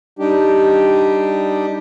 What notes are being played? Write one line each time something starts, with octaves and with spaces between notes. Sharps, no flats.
G3 D4 D#4 G4